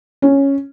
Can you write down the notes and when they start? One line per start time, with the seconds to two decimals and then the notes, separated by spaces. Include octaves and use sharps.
0.22 C#4